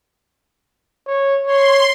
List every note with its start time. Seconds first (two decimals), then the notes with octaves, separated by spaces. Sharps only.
1.07 C#5
1.47 C#5 C6